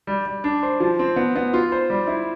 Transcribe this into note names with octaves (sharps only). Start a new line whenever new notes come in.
G3
G3
D4
C5
F3
C4
B3
B3
F4
C5
G3
E4